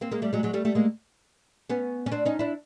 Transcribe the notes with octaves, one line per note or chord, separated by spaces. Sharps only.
A#3 C4
G#3 A#3
G3 A3
F#3 G#3
F#3 G#3
G3 A3
G3 A3
G#3 A#3
B3 C#4
C#4
C4 D4
C#4 D#4
D4 E4